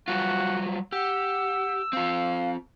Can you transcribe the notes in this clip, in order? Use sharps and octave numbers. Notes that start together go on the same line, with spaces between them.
F#3 G3 F4 F#4
G4 F#5 E6
C4 F4 F5